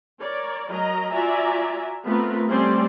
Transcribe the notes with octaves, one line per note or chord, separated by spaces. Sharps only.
A#4 C#5 D5
F#3 A#4 D#5 A#5
F4 F#4 D5 E5 G#5 A#5
A3 B3 C4 F4 A#4 B4
G3 A3 C4 C#4 C5 D5